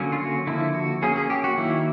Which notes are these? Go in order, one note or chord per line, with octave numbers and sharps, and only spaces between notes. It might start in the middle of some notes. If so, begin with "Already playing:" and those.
Already playing: D3 F#3 A#3 C#4
F4
F#4
D3 F3 A#3 E4
F#4
F#3 A#3 C#4 G#4
G#4
G4
F#4
D#3 F#3 A#3 E4